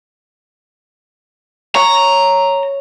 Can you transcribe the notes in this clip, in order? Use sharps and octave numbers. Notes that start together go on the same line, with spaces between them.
C#5 A#5